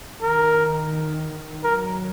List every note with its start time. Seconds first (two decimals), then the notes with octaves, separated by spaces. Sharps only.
0.22 D#3 A#4
1.63 F#3 A#4